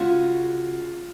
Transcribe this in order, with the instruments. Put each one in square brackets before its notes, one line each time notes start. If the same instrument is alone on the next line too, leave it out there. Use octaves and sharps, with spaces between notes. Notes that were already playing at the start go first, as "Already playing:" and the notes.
Already playing: [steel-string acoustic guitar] C#3 G#3 C#4 F#4 C#5 [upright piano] F4